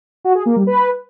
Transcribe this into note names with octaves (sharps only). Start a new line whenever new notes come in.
F#4
G#4
A#3
G3
B4